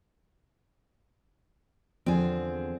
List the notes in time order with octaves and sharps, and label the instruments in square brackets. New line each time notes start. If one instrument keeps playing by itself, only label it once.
[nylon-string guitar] E2 D3 F3 [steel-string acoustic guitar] C4 G#4